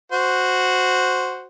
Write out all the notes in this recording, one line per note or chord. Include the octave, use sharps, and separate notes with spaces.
F#4 C5